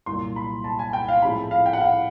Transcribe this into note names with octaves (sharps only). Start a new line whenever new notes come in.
C2 A#2 F#3 C6
B5
A5
G#5
G5
F5
A2 F3 G#3 C4 B5
F5
G5
F#5
F5